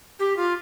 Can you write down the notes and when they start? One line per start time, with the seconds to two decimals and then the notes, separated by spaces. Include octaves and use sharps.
0.19 G4
0.37 F4